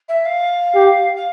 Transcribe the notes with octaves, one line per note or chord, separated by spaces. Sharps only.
E5
F5
G4
F5